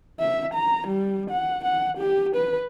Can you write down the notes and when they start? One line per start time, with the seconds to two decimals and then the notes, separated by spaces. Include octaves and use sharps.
0.20 E5
0.54 A#5
0.87 G3
1.30 F#5
1.65 F#5
1.98 G4
2.36 B4